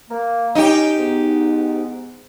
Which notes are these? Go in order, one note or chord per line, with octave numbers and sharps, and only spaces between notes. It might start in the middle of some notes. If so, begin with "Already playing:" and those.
A#3
C#4 D#4 G4
G#2 B3